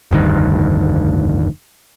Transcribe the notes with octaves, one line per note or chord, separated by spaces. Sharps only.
F1 D2 G2 D#3